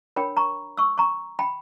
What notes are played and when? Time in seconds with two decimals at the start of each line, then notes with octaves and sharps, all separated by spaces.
0.16 D4 A#4 C#5 G5 B5
0.37 A#5 C#6
0.77 C#6 E6
0.98 A#5 C#6
1.39 G5 B5